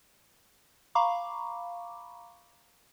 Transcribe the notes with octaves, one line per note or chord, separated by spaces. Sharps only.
F5 A#5 B5 C#6 D6